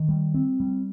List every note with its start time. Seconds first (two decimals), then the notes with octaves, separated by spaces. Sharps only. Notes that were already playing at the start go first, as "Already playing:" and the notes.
Already playing: D#3
0.09 G3
0.34 C4
0.60 G3